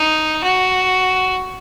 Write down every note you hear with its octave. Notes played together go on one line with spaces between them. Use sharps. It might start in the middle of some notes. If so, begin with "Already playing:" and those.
Already playing: D#4
F#4